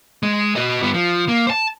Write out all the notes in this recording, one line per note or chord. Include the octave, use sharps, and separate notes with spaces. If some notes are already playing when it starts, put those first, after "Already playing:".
G#3
F#4 D#5
G2 B3
F3
A#3
C5 A5